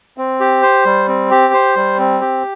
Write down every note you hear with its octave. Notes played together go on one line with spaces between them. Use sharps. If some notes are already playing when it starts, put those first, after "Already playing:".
C4
G4
C5
G3
C4
G4
C5
G3
C4
G4